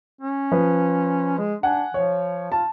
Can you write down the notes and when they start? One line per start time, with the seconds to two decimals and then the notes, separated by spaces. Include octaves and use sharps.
0.21 C#4
0.52 F3 B4
1.38 G#3
1.63 D4 F#5 G#5
1.94 F3 C#5
2.52 F4 A5